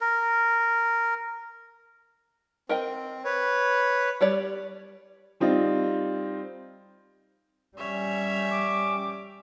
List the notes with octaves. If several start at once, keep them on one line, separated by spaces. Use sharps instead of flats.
A#4
C4 A#4 D#5 G5
B4 C#5
G3 C#5 D5
G3 C4 D#4 F4
G3 C#4 C#5 E5
D6